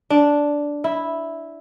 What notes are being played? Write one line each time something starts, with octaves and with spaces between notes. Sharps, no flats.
D4
E4